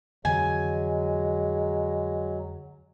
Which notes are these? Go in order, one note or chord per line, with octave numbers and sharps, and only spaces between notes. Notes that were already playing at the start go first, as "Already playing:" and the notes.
F2 D3 E3 F#3 G#3 G#5